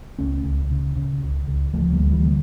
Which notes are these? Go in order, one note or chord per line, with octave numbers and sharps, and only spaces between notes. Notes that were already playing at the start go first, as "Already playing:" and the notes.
C#2 A3 C#4
C#2
C#3
C#3
C#2
C#2
D2 F3 A3
G3 A#3
D2
E3 G3
D3